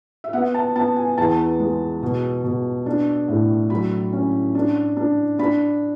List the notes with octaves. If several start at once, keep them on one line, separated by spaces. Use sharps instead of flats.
E5
B3 F#5
A5
B3 A5
G#5
E2 A5
G#3
B2
B2
D4
A2
F#3 B5
C#4
D4
D4
D4 B5